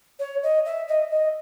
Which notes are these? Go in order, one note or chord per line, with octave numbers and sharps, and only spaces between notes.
C#5
D#5
E5
D#5
D#5